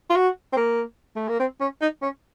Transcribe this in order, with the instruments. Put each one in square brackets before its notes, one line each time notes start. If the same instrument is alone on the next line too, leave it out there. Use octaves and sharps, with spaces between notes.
[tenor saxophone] F4
F#4
C4
A#3
A3
A#3
C4
C#4
D#4
C#4